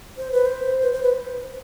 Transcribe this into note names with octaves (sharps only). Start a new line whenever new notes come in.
C5
B4
C5
B4
C5
B4